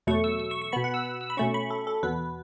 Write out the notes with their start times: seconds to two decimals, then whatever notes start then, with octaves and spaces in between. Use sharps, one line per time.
0.07 E2 B2 F#3 A3 C#6
0.24 E6
0.40 E6
0.51 C#6
0.62 C#6
0.72 B2 B3 B5
0.84 F#5
0.94 E6
1.06 E6
1.21 E6
1.30 B5
1.37 B2 A3 C#4 C#6
1.54 B5
1.70 A4
1.87 A4
2.03 E2 B2 B3 B4